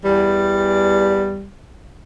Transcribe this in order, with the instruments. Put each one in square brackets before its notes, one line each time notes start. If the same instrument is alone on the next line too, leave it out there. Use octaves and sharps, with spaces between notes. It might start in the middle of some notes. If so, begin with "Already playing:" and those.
[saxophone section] E2 G3